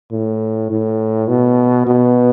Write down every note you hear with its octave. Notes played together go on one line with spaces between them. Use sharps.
A2
A2
B2
B2